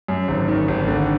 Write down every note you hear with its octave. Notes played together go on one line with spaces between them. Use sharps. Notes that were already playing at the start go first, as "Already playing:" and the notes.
F#2
G#1
D#3
G#1
D3